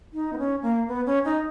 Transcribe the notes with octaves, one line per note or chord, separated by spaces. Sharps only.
D#4
B3
C#4
A#3
B3
C#4
D#4